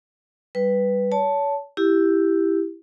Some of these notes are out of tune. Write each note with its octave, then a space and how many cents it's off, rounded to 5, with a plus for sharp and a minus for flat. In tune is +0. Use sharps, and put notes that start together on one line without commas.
G3 +0 B4 +0
C#5 +30 A5 +0
E4 +0 G4 +0